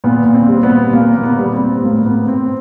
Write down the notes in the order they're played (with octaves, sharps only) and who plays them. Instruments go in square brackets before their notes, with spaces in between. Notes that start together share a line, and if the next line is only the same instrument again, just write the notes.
[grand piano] A#2 B3
A#2
C4
G3
B3
A#2
A#2 A#3
A#2
B3
G3
C4
A#2
A2 A#3
A2 B3
A2 C4